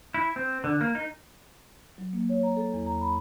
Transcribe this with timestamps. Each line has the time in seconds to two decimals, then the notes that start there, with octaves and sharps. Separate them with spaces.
0.14 E4
0.36 C4
0.64 D3
0.81 A#3
0.95 D#4
1.98 F#3
2.13 A#3
2.29 C#5
2.43 A#5
2.57 A4
2.73 E2
2.86 A#5
3.01 B5